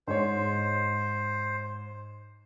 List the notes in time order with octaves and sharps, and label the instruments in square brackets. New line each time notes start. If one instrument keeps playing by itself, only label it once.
[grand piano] G#2 C#5 [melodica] C5